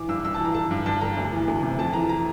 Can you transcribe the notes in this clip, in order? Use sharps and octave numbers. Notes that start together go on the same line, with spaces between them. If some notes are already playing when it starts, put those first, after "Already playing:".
Already playing: E3 D6
G2 E6
G2 E6
A5
E3 A#5
D3 A5
G2
G2 A5
D3 A#5
D2
E3
D2
C3
F2 A5
E3 A#5
A#5